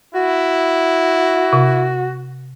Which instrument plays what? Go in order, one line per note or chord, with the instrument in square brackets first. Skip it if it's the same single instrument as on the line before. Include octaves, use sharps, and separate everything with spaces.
[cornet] E4 [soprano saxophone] F#4
[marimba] C3